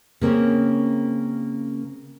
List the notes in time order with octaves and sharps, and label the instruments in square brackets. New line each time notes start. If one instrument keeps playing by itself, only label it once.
[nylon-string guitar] C#3 A#3 C4 C#4